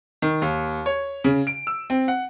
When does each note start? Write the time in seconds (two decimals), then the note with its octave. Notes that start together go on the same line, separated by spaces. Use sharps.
0.22 D#3
0.42 D#2
0.86 C#5
1.24 C#3
1.47 D7
1.67 E6
1.90 C4
2.08 F#5